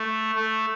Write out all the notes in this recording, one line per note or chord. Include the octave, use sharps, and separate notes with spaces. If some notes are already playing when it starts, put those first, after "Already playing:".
Already playing: A3
A3